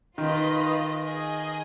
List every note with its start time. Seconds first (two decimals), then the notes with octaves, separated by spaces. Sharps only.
0.18 D#3 F4 B4 D#5
1.03 G#4 D#5 G#5